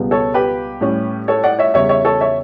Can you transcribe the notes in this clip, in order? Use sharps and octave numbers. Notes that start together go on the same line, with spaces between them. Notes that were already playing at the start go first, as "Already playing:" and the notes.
Already playing: C#2 B2 G3 B3
A4 C#5
G4 B4
A2 G3 C#4
A4 C#5
D5 F#5
C#5 E5
E2 C#3 G3 C#5 E5
C#5 E5
A4 C#5
C#5 E5